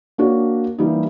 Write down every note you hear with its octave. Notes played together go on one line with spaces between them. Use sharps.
A#3 D4 F#4 C#5
E3 G3 A#3 D4 D#4